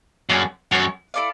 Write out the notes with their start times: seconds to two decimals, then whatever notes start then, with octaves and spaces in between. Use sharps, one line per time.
0.29 F#2 A#3 D4 F4 G#4
0.71 F#2 F#4 A#4 C#5
1.14 E4 A4 D5 F5